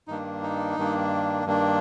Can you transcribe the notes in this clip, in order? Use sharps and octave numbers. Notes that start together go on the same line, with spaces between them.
G2 D#3 A#3 D4 D#4
D#4
G2 D#3 A#3 D4
G2 D#3 A#3 D4